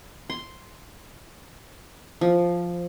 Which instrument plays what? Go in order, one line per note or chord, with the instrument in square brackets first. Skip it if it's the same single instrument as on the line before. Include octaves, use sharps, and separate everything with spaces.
[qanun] C6
F3